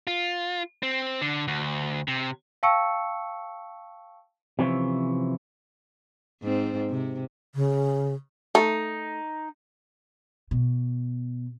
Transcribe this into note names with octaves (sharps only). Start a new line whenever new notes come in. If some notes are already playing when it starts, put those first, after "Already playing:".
F4
C4
D3
D2
C3
F5 G5 A5 C#6 E6 C#7
C3 E3 F3 C#4
G#2 C4
C3
C#3
A3 D#4
B2